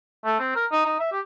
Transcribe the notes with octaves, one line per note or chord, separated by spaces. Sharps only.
A3
C4
A#4
D#4
D#4
E5
G4